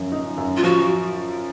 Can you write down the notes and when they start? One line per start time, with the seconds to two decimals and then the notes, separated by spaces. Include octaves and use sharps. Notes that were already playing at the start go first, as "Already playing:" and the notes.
Already playing: F#2 F3
0.12 D#4
0.38 F#2
0.57 F4
0.63 F3 F#4